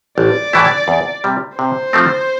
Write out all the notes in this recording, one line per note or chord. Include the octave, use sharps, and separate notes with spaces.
A1 D5
A2 E3 A3 E4
E2
C3 G3
C3 C5
F3 A3 C4